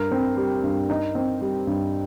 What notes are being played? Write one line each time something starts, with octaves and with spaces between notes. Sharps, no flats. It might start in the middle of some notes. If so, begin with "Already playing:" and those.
Already playing: G2 A#4
C4
G3
G2
D#4
C4
G3
G2